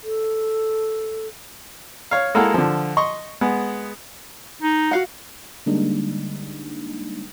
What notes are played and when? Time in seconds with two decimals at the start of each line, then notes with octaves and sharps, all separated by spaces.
0.03 A4
2.11 C#5 F5
2.35 G#3 A#3 E4 A4 F#5 F6
2.54 D3 F3
2.97 D#5 C6 C#6
3.41 G#3 B3
4.62 D#4
4.91 F#4 F5 F#5
5.66 D3 G3 G#3 A#3 D4 D#4